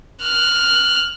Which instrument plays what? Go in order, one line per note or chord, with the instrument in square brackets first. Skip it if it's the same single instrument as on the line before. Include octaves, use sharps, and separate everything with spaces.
[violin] F6 F#6